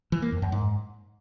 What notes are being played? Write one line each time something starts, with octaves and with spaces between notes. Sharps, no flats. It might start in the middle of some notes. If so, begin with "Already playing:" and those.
E3
A#3
F2
F#2
G#2